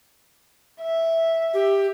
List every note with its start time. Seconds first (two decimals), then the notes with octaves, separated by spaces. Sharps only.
0.81 E5
1.54 G4